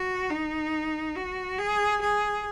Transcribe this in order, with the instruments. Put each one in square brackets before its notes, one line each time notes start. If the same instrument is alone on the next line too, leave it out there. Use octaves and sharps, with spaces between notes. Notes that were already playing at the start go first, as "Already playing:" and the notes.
Already playing: [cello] F#4
D#4
F#4
G#4
G#4